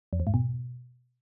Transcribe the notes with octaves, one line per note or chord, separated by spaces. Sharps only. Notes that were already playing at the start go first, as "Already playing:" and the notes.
F2
E2
G#2
B2